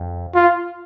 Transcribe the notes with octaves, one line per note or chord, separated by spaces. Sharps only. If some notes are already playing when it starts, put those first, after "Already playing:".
Already playing: F2
F4